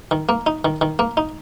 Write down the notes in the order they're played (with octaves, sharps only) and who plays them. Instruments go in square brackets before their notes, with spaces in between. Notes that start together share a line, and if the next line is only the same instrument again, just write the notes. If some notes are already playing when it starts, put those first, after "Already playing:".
[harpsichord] D#3
A#3
D#4
D#3
D#3
A#3
D#4